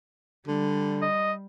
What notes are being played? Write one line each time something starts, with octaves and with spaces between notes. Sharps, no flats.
D3 G3
D#5